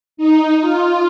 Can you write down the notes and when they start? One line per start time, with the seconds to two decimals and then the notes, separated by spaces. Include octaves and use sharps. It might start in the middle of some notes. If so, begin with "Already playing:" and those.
0.17 D#4
0.61 F4